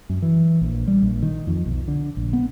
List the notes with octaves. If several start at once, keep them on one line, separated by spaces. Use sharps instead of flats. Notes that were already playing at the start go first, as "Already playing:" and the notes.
F#2
E3
A#1
G3
A#1
D#3
F2
B1
D3
A#1
B3